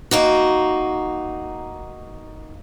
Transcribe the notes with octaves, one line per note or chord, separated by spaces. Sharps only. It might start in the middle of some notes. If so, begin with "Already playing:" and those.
A#3 D#4 F#4